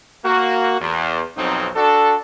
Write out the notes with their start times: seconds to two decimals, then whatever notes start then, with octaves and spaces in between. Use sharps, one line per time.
0.24 A#3 F#4
0.80 E2
1.36 B1 F2 F#3 C4 D#4
1.75 D4 F#4 A4